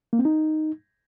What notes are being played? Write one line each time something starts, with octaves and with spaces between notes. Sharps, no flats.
A#3
C4
D#4